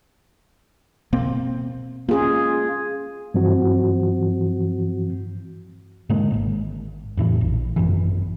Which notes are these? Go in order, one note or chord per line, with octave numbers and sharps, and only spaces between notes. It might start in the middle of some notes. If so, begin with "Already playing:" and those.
B2 A#3 C4
A#3 C#4 F4 G#4
G2 E3 F3 C4 F#4
G#2 D3 G#3 A#3
D#1 G#1
F2 A2 C#3 E3
A#1
G#1 F#2 E3